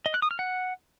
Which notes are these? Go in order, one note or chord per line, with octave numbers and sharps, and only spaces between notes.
D#5
F#6
D#6
F6
F#5